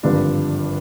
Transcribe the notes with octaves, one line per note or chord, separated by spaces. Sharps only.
G#1 G2 D3 F3 D4